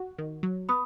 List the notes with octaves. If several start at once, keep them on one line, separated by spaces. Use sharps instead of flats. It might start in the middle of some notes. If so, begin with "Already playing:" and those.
Already playing: F#4
D#3
F#3
B3 B5 D#6